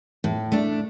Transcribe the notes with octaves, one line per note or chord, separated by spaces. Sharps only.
A2
A3 D4